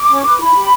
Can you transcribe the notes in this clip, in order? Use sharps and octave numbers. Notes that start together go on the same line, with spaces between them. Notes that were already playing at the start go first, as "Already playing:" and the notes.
Already playing: D6
C#4
B4
E4 B5
G4